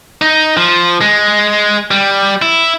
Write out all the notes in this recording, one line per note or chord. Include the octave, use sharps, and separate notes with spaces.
D#4
F3
G#3
G3
E4